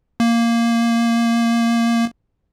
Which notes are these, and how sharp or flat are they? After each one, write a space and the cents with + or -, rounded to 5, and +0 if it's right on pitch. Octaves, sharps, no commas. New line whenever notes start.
A#3 -5